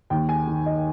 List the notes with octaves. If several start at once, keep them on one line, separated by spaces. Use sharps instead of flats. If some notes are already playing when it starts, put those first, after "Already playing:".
D#2 G5
G#5
D#3
D#5